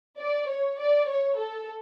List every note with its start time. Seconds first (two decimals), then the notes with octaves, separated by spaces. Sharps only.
0.18 D5
0.48 C#5
0.78 D5
1.07 C#5
1.37 A4